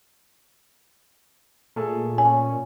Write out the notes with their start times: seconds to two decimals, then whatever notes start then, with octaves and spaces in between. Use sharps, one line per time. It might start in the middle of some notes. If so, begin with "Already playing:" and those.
1.76 A#2 A3 G#4 A4
2.18 C#4 G#5